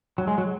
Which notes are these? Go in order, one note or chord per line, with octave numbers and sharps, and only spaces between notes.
F#3
G#3
F#3